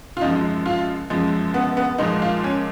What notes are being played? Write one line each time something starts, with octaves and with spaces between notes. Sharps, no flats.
F4
F#2 F3 G#3 D#4
F4
F#2 F3 G#3
B3
B3
A#2 F3 G#3 D#4
F4
C#4